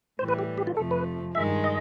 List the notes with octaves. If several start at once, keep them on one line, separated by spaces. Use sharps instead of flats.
A2 E3 G3 C5
B4
G4
G4
F4
F2 C3 F3 A3 A4
B4
G2 D#3 G#3 E5
D#5